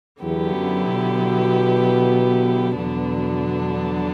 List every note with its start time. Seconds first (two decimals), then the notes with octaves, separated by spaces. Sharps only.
0.23 E2 D3 F#3 B3 E4 G4
0.54 F#2
0.86 B2
2.78 E2 B2 D3 F#3 B3 D4